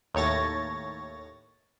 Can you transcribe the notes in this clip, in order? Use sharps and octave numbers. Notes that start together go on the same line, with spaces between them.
D#2 A2 C#5 A6 A#6